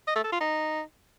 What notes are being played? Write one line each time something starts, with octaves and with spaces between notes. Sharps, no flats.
D#5
A3
A4
F4
D#4